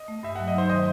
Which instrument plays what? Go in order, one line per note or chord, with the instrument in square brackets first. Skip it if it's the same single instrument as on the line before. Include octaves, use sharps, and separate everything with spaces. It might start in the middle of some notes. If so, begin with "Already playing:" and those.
Already playing: [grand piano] D#5
[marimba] A3
[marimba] G2 [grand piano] E5
[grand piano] F#5
[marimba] F#3
[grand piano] D#5
[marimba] D#4 [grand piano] C5
[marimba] D#3 [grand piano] D#5